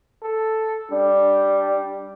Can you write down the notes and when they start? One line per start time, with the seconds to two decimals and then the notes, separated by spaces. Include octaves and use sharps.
0.22 A4
0.91 G3 D4